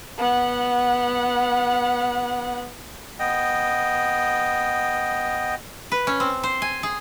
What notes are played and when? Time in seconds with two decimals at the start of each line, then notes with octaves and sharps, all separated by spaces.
0.18 B3 F#5
3.19 B3 D#5 G5
5.92 B4
6.07 C#4
6.20 C4
6.44 C5
6.62 G#5
6.83 G#4